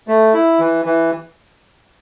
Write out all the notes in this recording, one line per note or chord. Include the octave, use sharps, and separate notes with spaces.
A3
E4
E3
E3